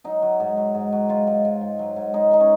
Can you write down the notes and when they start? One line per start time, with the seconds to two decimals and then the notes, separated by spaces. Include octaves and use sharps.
0.04 F#3 D#4
0.22 F#3
0.40 G#2
0.57 F#3
0.75 G#2
0.92 F#3
1.09 G#2 F4
1.27 G#2
1.45 G#2
1.61 G#2
1.79 F#3
1.96 G#2
2.14 G#3 D#4
2.31 G#3 D#4
2.40 C#4